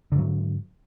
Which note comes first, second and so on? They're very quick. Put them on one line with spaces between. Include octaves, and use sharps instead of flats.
D3 G#2 F#3